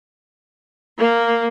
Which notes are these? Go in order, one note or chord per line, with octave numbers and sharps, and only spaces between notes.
A#3